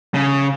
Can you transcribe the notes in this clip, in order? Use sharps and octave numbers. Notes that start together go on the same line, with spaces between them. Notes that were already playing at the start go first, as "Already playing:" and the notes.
C#3